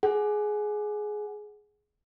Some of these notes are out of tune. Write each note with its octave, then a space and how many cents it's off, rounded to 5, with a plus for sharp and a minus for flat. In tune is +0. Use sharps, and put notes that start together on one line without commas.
G#4 +15 F#5 +15